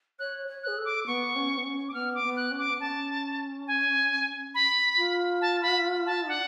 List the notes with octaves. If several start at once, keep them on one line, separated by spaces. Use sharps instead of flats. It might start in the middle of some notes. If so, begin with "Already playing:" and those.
C#5 F#6
C#5
G#4 F#6
A4
D6
B3 C#6
C#4
B3
C#4
D6
B3 F6
D6
B3
F#6
C#4
D6
B3
C#4 A5
G#5
B5
F4
A5
B5
A5
D4 F#5